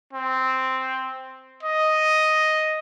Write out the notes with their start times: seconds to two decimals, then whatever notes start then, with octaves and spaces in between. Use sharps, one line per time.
0.13 C4
1.63 D#5